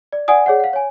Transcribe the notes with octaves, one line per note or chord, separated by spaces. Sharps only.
D5
D5 F#5 G#5 D#6
G#4 C#5 D5 F#5
F5 F#5
C#5 G#5